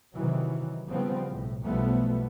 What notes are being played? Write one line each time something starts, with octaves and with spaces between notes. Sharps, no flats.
C3 D#3 E3 F#3
C#3 F3 G3 B3 C4
B1 A2
B1 B2 F3 G3 A3 B3